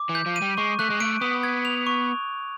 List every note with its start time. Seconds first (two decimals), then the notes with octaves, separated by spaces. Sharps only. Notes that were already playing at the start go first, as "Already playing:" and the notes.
Already playing: D6
0.09 E3
0.15 G6
0.26 F3
0.36 D#7
0.42 G3
0.57 G#3 C#6
0.79 A3 F#6
0.90 G#3
1.00 A3 D7
1.21 B3 D#6
1.43 G#6
1.65 F7
1.87 C#6